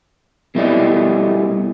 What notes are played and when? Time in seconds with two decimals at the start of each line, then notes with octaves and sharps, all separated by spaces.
0.55 B2 G3 A3 E4 D5 D#5